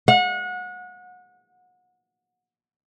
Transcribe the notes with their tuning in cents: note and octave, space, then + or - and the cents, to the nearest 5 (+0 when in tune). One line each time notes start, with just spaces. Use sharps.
F#5 -30